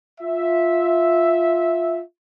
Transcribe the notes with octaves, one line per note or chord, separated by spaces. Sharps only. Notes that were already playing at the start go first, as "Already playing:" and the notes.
F4 E5